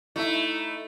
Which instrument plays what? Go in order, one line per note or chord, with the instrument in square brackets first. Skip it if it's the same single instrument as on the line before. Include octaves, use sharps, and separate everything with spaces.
[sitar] A3 [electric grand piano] D#4 E4 E5